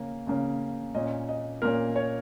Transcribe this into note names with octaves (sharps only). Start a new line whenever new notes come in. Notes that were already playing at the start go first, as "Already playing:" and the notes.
Already playing: C#3 A#3 C#4
C#3 A#3 C#4
A#2 A#3 C#4 D#5
D#5
A#2 A#3 C#4 A#4
C#5